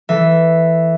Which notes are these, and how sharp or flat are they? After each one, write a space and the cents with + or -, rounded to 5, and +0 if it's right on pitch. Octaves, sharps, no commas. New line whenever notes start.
E3 +0 A4 +0 E5 +0